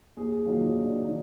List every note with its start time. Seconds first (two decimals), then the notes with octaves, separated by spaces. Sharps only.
0.17 D#2 G#4
0.32 G#4
0.46 D#3 F#3 A#3 F4
0.61 D#4
0.75 D#2 D4
1.04 D#3 F#3 D#4